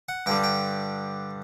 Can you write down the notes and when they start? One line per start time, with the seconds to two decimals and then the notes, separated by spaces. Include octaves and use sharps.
0.09 F#5
0.26 G2 D3 G3 G5
0.44 G5